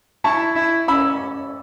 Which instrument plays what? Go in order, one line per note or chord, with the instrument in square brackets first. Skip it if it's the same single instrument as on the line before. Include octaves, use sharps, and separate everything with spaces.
[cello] E4 [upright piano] A5 C#6
[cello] E4
[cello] C#4 [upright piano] B5 E6